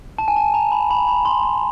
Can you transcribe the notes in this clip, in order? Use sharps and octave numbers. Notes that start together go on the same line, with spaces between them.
A5
G#5
A5
A#5
B5
B5
B5
C6
B5